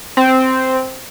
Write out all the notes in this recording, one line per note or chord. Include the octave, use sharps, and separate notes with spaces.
C4